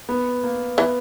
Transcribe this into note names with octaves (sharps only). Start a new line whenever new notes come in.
B3
A#3
E3 B3